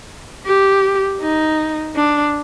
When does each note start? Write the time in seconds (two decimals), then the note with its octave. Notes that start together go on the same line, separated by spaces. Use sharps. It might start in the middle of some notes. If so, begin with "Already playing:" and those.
0.46 G4
1.21 D#4
1.96 D4